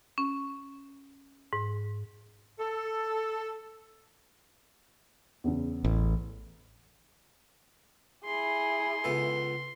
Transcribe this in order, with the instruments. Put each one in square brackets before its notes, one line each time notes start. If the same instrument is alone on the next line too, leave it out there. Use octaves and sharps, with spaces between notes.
[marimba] C#4
G#2
[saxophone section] A4
[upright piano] E2 C#3
[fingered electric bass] A1
[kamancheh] E4 G#4 [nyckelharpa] C6
[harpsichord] C#2 B3 A4